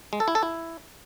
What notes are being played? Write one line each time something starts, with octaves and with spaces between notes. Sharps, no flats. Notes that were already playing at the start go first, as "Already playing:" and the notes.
G#3
A4
E4
A4
E4